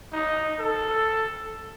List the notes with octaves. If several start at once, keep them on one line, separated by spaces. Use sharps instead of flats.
D#4
A4